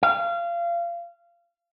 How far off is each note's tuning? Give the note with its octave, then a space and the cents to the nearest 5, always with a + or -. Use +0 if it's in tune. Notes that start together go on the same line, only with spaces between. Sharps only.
F5 -25